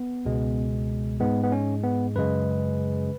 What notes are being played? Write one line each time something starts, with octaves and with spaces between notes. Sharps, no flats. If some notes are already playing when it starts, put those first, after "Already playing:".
Already playing: B3
C#2 B2 G#3
G#2 G#3 B3
B3
C#4
B3
F#2 C#3 G#3 B4